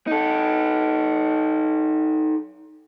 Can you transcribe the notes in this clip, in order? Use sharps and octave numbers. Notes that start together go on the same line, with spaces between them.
D#4 A4